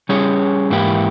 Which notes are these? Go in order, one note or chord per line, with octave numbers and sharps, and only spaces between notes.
G3 C#4 G#4 C#5
G#2 E3 A#3 E4 G4